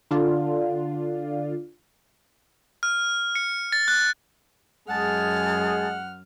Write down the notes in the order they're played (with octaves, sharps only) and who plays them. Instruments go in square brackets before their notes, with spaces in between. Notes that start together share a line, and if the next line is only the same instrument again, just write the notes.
[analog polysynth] D3 D4 F4
[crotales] F6
C#7
A6
F#6
[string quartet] F#2 F6 [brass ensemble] G#3 G#4 [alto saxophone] F#5 [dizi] A5